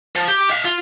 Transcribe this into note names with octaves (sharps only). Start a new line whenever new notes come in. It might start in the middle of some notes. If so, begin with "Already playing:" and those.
F3
G4
E5 F5
F4